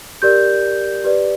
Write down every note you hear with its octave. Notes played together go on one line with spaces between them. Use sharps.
G4 A#4 D5 G6
G4 B4 D5